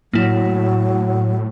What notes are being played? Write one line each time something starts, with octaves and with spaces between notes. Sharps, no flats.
A2 F#3 A#3 E4